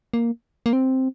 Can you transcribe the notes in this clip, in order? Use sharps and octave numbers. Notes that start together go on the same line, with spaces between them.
A#3
A#3
C4